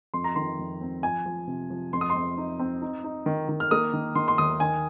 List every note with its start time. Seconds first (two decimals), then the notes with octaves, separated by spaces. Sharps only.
0.14 F2 C6
0.24 A#5
0.35 D#3 C6
0.59 F2
0.81 C4
1.03 F3 G#5
1.26 F3
1.47 C3
1.70 F3
1.93 F2 C6
2.01 D#6
2.10 C6
2.15 C4
2.37 D#4
2.60 C4
2.82 D#4
3.04 D#4
3.26 D#3
3.49 D#3
3.60 F6
3.71 A#3 D#6
3.93 D#3
4.15 D#3 C6
4.28 C6
4.38 D#2 D#6
4.60 D#3 G#5